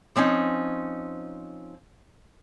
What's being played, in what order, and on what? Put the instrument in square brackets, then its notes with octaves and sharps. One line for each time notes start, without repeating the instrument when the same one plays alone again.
[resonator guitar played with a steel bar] F3 C4 C#4 D#4